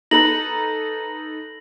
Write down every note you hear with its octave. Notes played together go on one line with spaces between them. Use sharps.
D#4 A4 B4 A#6 F#7